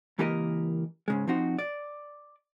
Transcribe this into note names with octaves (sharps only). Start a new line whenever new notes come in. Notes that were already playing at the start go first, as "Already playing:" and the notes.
C#2 E3 A#3 G4 A#4 D#5
G#2 C#3 G#3
F3 C4 D#4 F#4
D5